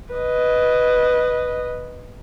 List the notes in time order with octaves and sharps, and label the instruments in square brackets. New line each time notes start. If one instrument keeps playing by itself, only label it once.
[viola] B4 D#5